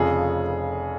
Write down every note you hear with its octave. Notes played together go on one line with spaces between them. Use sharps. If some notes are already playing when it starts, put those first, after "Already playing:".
Already playing: F1 F2 C#3 F3 G#4